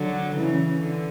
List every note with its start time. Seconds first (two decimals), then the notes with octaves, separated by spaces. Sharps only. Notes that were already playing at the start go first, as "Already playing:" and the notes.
Already playing: D3 F#3
0.36 C#3 E3
0.80 D3